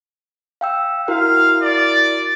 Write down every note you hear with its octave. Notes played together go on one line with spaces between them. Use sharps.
F5 G5 E6
E4 F#4 A#4 F5
D5